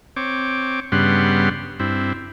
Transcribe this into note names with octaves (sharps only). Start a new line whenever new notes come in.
C4 C#5 D6
G2 C#3 G3 B3 F#5 C6
G2 C4 E4